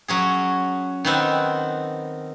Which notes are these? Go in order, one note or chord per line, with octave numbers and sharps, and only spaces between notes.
F#3 C#4 G#4
D#3 B3 C4